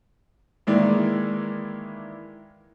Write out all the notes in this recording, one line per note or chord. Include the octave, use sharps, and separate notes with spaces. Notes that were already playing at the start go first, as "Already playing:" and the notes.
D#3 E3 G#3 A#3 E4 D5